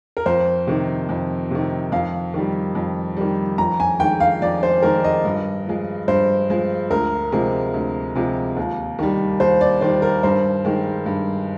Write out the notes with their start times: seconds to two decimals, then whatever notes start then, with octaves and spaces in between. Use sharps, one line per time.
0.17 A#4
0.26 F2 C5
0.67 C3 D#3
1.09 F2
1.51 C3 D#3
1.92 F2 F5
2.34 D#3 G3
2.75 F2
3.17 D#3 G3
3.58 F2 A#5
3.80 G#5
4.00 D#3 G#3 G5
4.20 F5
4.42 F2 D5
4.63 C5
4.82 D#3 G#3 A#4
5.04 D#5
5.25 G2
5.66 F3 G#3
6.08 G2 C5
6.50 F3 G#3
6.90 D2 A#4
7.32 C3 F3 G#3
7.74 D2
8.15 C3 F3 G#3
8.57 D#2
8.99 D#3 G3
9.40 D#2 C5
9.61 D5
9.81 D#3 G3 C5
10.02 A#4
10.23 G2 C5
10.65 D#3 G#3
11.06 G2